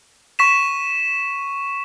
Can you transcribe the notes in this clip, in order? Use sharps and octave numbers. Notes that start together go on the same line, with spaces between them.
C#6 B6 E7